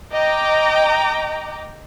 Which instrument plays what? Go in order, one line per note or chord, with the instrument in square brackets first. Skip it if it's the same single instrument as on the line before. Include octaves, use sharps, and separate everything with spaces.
[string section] D#5 G5 A#5 D6